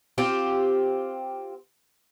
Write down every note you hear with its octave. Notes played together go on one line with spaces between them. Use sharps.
C4 F4 G4